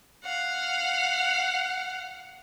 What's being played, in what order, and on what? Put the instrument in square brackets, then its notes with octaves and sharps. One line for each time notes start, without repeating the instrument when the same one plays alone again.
[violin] F5 F#5